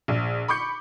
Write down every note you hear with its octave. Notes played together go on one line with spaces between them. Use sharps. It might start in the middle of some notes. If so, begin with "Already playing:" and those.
A#1
B5 C#6 D6 G6 C#7